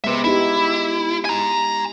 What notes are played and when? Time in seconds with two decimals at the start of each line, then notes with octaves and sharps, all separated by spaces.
0.04 G#3 B3 B4 C5 E5
0.24 B3 D#4 E4 G4
1.25 G#5 A#5